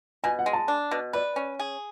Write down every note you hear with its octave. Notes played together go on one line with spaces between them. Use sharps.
B2 G#5
F#5
G#3
A5
D4
B2
B4 D5
C#4
G#4